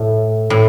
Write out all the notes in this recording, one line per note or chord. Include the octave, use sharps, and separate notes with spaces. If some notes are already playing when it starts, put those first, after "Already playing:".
Already playing: A2
A2